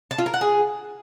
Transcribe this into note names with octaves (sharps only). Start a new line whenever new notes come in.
A5
F4
A#4
F#5
G#4